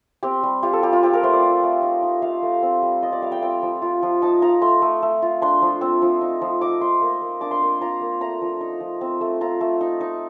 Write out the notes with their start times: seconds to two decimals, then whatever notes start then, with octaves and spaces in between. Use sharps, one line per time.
0.23 C4 G4
0.43 G3
0.63 F4 G4
0.73 A4
0.83 G3 G4
0.93 F4
1.03 C4 G4
1.13 A#4
1.23 A3 C5
1.33 D5
1.43 F4
1.63 A3
1.82 D#4
2.03 D#4
2.22 A3 F5
2.43 A3
2.63 C4
2.82 G3
3.02 F4 D#5
3.12 D5
3.22 G3 F5
3.32 G5
3.42 C4 G5
3.62 F3
3.82 F4
4.03 F3
4.22 D#4 A5
4.42 D#4 A#5
4.62 A3 C6
4.82 A3
5.02 A3
5.22 F4
5.42 D4 C6
5.62 F3
5.81 C4
6.02 F3
6.21 D#4
6.41 F3
6.61 D#4 D6
6.81 D#4 C6
7.02 A#3
7.22 A#3
7.41 D4 D6
7.51 C6
7.61 A#3
7.81 F4 A#5
8.01 A#3
8.21 A3 A#5
8.42 F3
8.61 D#4
8.80 F3
9.01 C4
9.21 A3
9.41 F4 A#5
9.61 A3
9.81 D#4
10.01 D#4